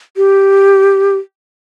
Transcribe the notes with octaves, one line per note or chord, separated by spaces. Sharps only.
G4